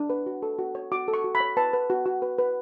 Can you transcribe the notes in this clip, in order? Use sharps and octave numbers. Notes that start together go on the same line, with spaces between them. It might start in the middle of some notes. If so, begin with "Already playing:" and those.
Already playing: D4
B4
F#4
A4
F#4
C#5
F#4 D6
A4
C#6
F#4
B5
C#5
B4 A5
B4
F#4
F#4
B4
B4